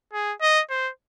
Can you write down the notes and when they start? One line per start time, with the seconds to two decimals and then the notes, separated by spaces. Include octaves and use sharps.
0.13 G#4
0.42 D#5
0.70 C5